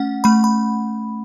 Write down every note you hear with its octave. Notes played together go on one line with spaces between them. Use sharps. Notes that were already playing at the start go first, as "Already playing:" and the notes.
Already playing: A3 C#4 F#5
A3 B5
B5